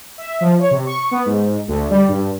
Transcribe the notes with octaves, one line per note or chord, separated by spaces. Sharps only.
E5
F3
C#5
C3
C#6
B3
G#2
D2
G3
G2